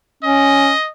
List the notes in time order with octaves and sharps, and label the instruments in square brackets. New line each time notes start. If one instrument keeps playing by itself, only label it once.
[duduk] C#4 [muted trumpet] D#5